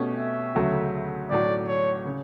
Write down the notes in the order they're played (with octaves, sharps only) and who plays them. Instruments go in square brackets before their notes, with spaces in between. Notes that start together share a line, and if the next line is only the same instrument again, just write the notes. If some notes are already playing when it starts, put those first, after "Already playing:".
Already playing: [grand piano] B2 A3 C#4 G4
[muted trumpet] E5
[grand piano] D2 C#3 F#3 A3
[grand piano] B1 A2 F#3 [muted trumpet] D5
[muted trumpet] C#5
[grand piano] C#3